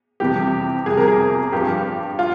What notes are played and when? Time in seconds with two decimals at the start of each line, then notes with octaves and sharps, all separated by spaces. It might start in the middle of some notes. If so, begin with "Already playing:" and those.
0.20 F2 C3 E3 G3 G4
0.86 F2 C3 G3 G#4
0.97 A#4
1.08 G#4
1.52 G2 F3 G4
2.19 F4